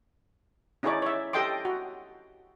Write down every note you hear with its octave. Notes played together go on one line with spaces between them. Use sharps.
C#4 D#4 E4 G#4 C#5 D5
C#5 E5
G4 A4 D#5 G5 C6 D6
F#4